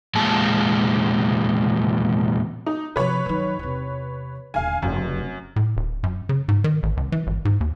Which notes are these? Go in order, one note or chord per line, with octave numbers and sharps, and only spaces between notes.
E2 A#2 G#3 A5
D#4
C3 F3 B4 C#5
F#2 D#3
E2 C3
D#1 D3 F5 G#5
F1 C#2 F#2
A2
D#1
F#2
C#3
G#2
D#3
A1
C#2
E3
G#1
G#2
D#2